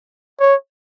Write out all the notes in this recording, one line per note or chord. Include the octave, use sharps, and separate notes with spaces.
C#5